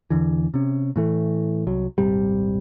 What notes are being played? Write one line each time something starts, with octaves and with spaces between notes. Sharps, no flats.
E2 D3 E3
C3 C#4
A2 E3 A3
C2 F#3
D#1 G#1 C3 G3